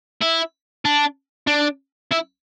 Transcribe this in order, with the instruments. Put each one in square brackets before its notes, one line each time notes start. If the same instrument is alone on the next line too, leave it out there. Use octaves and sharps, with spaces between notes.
[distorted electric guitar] E4
D4
D4
E4